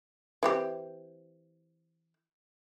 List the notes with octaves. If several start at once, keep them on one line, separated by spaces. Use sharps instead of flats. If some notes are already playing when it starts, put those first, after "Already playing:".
E3 C4 G4